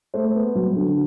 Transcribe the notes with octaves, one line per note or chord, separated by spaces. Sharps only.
A3 C5
B3
F#3
D3